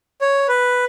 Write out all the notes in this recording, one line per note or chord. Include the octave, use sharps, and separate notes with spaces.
C#5
B4